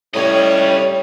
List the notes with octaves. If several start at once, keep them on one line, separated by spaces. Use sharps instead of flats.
A2 G3 C#4 C#5 D#5